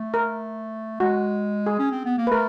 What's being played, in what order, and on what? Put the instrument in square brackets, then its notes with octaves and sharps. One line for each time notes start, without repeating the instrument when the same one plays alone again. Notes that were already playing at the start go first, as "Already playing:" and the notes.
Already playing: [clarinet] A3
[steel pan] A#4
[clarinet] G#3 [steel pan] F#4
[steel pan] G#4
[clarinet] C#4
C4
B3
A#3
[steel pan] B4
[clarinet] A3 [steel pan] A#4